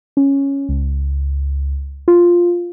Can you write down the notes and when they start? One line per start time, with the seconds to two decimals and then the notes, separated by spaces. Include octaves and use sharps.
0.17 C#4
0.69 C#2
2.08 F4